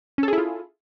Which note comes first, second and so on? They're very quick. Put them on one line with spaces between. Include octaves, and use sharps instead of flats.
C#4 A4 G#4 E4 F4